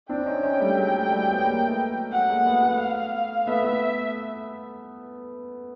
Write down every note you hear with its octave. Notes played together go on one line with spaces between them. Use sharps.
C4 D4 G5
C#4 D#4
C#4 D#4
G3 A3
F#3 G#3
G3 A3
G3 A3
A3 B3
G#3 A#3
A3 B3
F#3
F#3 F#5
G#3 A#3
A3 B3
A3 B3
F5
A3 B3 E5
A3 B3